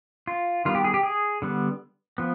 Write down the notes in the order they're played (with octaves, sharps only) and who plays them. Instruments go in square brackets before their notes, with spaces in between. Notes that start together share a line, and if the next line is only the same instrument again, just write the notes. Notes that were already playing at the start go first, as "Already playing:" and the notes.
[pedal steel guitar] F4
D#3 G3 B3 F4
G4
G#4
G4
G#4
D3 G3 B3
F3 B3